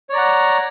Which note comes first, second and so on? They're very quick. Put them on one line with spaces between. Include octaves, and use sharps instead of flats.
C#5 D5 A#5 F#5